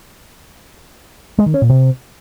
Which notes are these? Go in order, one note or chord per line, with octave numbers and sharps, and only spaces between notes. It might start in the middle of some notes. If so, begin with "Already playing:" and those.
G#3
D#3
C#4
A#2
C3